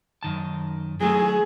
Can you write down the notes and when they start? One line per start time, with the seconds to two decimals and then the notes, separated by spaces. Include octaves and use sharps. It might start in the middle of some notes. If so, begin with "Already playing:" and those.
0.23 F#2 D#3 A5
1.01 F#3 A3 G#4